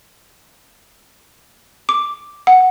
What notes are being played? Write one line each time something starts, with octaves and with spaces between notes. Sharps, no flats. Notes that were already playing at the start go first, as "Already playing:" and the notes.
D6
F#5